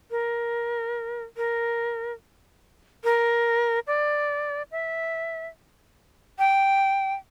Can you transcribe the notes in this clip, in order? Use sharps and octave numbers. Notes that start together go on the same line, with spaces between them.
A#4
A#4
A#4
D5
E5
G5